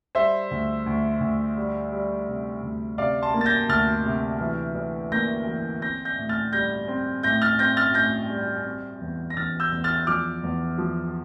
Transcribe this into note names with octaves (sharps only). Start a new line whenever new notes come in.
G3 C5 E5
D2
D2
D2
G3
G3
C3
D2
C3 D5 F5
A5 C6
A#3
A6
G6 A#6
D2 F6 A6
C3
E3
E3
A#3 G6 A#6
E3
C4 G6 A#6
G6 A#6
A2
F6 A6
G3 G6 A#6
C4
A2 G6 A#6
F6 A6
C4 G6 A#6
F6 A6
A2 G6 A#6
G3
C4
E2
A#6
E2 F6 A6
E6 G6
E2
F6 A6
F3 D6 F6
E2
F3